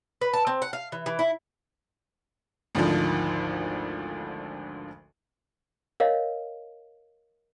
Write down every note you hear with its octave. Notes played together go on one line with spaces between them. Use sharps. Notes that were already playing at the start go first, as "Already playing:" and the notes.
B4
A5
C4
F#5
F5
E3
E3
E4
G#1 D2 D3 D#3 F3
A#4 C#5 D#5 F5